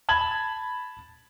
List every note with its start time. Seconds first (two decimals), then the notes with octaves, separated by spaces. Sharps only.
0.09 A5 B5 G#6 F#7